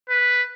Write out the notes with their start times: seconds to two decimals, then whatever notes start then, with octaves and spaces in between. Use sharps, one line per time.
0.10 B4